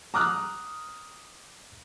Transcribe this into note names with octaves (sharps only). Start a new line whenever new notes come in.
A#5 D6 D#6 F6 F#6